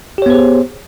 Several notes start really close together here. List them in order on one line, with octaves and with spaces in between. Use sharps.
G4 C#5 B3 C5 G#4